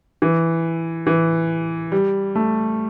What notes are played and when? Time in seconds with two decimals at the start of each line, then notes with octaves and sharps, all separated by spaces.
0.22 E3
1.07 E3
1.92 G3
2.35 A3